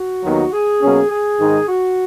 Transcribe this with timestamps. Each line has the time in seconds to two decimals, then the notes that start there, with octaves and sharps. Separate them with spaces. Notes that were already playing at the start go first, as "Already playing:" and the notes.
Already playing: F#4
0.23 D#2 D#3 F#3 B3 D#4
0.52 G#4
0.81 B2 F#3 A#3 C#4
1.10 G#4
1.38 G#2 D#3 G#3 D#4
1.68 F#4